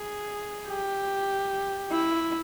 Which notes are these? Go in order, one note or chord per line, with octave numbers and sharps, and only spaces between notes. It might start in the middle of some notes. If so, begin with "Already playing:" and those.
Already playing: G#4
G4
E4